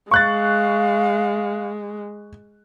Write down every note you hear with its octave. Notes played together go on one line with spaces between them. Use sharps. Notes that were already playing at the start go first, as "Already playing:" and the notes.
G#3 F5 C#6 F#6 A6